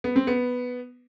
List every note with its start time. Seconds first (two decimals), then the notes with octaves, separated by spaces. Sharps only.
0.04 B3
0.16 C4
0.27 B3